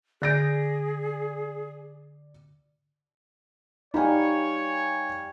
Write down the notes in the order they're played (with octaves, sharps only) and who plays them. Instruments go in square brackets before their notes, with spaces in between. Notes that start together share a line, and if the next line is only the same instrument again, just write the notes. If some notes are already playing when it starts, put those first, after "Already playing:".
[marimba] D3 G6 [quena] G#4 [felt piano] D5 A#6 D7
[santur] G3 A#3 B5 [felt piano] D#4 G#5 [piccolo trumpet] C#5